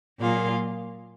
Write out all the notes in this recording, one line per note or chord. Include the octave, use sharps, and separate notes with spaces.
A#2 F#3 A#3 F4 G#4